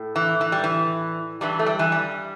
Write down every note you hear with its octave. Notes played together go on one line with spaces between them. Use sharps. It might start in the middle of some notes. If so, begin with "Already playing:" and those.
Already playing: A2
E3
E3
G3
E3
G2 E3 G3
A3
G3
E3
G3